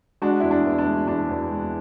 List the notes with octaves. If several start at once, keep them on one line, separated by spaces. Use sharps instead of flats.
G#3 D4 F#4
E2 E4
D4
E2
D4
G#3
E2 D4
E2
G#3